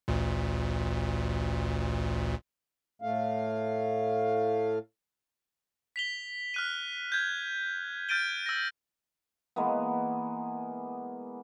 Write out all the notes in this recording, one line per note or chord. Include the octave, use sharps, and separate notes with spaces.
A1 D2 A#2
A2 A3 F5
B6 F7 G7
F6 F#6 D#7
G6 G#6
F6 G6 A6 D7 D#7 G7
E6 A#6
E3 G#3 A#3 B3